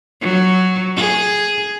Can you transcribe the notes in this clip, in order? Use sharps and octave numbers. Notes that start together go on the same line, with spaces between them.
F#3
G#4